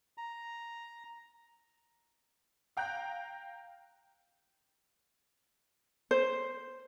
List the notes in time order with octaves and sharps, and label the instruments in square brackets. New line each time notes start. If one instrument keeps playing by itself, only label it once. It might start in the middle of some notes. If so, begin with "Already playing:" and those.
[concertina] A#5
[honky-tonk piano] F5 G5 A#5 F#6
[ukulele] C5